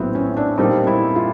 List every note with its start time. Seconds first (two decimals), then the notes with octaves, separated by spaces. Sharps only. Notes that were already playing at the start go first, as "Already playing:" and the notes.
Already playing: A#1 A2 F#3 B3 C4
0.15 C#4
0.37 D4
0.58 A#2 G3 C4 D#4
0.87 E4
1.16 F4